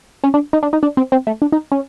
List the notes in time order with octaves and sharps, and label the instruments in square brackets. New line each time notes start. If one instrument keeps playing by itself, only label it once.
[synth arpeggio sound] C#4
D4
D#4
D4
D#4
D4
C4
C4
A3
D4
D#4
C#4